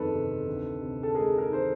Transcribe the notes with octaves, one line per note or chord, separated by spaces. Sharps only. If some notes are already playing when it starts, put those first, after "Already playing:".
Already playing: G1 F2 D#3 A4 B4
C3
D2
C3
A4
G#3 G#4 A#4
G#4 A#4
D#3 C5